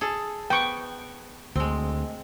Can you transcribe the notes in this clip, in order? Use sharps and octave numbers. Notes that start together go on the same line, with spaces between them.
G#4 A4
B3 G5 C#6
D2 G#3 C4